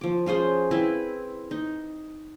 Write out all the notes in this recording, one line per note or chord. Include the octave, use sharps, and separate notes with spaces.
F3 D6
C#4 F4 G#4 C5
C4 E4 B4
D#4